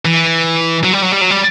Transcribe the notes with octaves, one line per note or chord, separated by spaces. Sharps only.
E3
F#3
G3
F#3
G3
F#3
G3